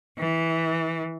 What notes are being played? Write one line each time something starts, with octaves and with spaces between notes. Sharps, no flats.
E3